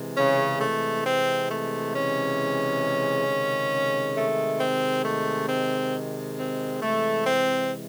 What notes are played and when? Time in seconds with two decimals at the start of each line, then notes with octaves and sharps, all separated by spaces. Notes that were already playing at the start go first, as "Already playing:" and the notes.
Already playing: C3 E3 G#3
0.16 C#3 C#4
0.61 A3
1.05 C4
1.50 A3
1.94 C#3 C#4
3.27 C3 D#3 G#3
4.16 A3
4.60 C4
5.05 A3
5.49 C4
6.38 C4
6.82 C3 E3 G#3 A3
7.26 C4